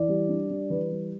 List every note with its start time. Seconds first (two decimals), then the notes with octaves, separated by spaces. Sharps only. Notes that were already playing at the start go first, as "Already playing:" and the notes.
Already playing: E3 D5
0.08 G3
0.28 D4
0.50 G3
0.70 E3 B4
0.91 G3